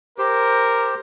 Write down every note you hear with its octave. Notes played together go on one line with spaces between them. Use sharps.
G4 A#4 C5